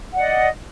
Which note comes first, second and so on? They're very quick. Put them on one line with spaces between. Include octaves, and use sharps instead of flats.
F#5 D5 D#5